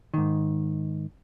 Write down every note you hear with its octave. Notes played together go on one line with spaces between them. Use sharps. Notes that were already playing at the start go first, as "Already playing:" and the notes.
G#2 D#3